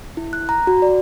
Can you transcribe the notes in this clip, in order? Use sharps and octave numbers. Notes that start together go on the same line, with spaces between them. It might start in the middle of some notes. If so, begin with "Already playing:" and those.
E4
F#6
A#5
F#4
D5